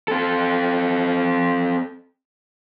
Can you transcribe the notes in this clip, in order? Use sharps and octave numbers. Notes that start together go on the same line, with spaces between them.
C4 A4